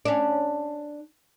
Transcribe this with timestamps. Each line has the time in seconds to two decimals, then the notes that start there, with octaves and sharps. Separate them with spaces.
0.05 C#4 D4